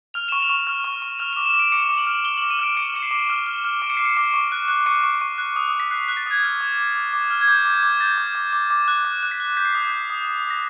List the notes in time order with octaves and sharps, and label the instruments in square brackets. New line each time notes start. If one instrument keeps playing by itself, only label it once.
[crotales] F6 F7
C#6 E7
F7
C#6
F6
C#6
C#6
F6 F7
D6 E7
E7
D6
D7
D6 C#7
D6
F#7
F6
D6 G7
D6 F#7
D#7
F6 D7
D6 C#7
D6 C#7
C7
D6
F6
F6
F6
D6 D7
C#7
D6 C7
C#7
D6
C#6
F#6
F#6
C#6 C#7
C#6
C#6
F#6
D#6
D#6
B6
F#6 C7
F#6 B6
A6
D#6 G#6
F6
D6
D6
D6
D6
F6
G#6
D6 G6
D6 G6
G#6
D6
G6 A6
D6
D6
D6
D6
F#6
D6
F#6
B6
F#6
G6 B6
C7
D#6 B6
G6
D#6
D#6
D#6
A#6